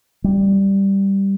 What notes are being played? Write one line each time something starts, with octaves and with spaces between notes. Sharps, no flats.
G3